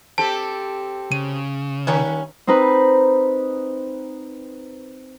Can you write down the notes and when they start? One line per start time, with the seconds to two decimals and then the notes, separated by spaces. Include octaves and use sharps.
0.18 C4 G4 A4 A5
1.12 C#3 D#7
1.87 D#3 G3 A#3 C#4
2.47 C4 D#4 B4